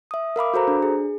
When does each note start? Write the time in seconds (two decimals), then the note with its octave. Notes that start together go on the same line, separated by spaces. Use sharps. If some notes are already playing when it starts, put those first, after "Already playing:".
0.11 E5 D#6
0.36 A#4 F5 B5 D6
0.54 F#4 A4 C5 A#5
0.68 D4
0.82 G#4